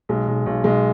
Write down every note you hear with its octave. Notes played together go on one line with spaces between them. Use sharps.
B1 G#3
B1
B1
B1 G#3